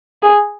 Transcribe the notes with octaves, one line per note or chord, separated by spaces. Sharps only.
G#4